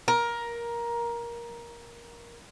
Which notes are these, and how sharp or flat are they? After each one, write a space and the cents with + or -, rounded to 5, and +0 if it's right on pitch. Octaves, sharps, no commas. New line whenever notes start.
A#4 +15